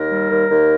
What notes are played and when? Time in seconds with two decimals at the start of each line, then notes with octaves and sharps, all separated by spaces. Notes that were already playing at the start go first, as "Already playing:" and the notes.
Already playing: D#2 A#4
0.11 G3
0.30 D#2
0.49 D#2